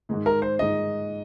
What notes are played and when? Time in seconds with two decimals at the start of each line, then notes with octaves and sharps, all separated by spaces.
0.09 G#2 D#3 G#3 D#4
0.26 A#4
0.42 C5
0.59 G#2 D#3 G#3 D#4 D#5